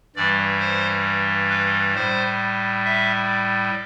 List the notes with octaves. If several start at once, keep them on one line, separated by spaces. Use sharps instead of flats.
G2 E3 G3 D5
C5
B4
A2 G3 C5
E5